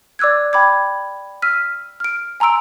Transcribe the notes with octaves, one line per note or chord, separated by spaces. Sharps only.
D5 D6 E6 F#6 G#6
G5 B5 D6 G#6
E6 F6 B6 D#7
F6 D7
G#5 A#5 C6 E6 D7